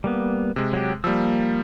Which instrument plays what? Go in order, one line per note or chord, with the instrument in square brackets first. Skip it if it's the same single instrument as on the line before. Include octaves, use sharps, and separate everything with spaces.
[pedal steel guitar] G3 A#3 B3
[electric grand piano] C3 G#3
[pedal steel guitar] F#3 G4
[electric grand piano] F3 G3 [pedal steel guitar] A#3 E6